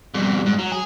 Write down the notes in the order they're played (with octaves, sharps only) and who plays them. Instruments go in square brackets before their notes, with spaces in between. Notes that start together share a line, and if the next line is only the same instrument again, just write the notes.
[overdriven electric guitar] F2 B2 [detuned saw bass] G3
[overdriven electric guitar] G#2
F#3
[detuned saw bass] F#3 [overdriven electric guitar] G#4